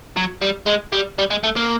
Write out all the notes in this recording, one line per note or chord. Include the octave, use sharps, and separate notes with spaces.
F#3
G3
G#3
G3
G3
G#3
A3
A#3